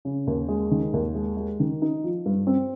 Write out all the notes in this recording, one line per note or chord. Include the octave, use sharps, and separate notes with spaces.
C#3
D#2
G#3
D#3
D#2
G#3
G#3
D#3
D#4
F3
G2
C4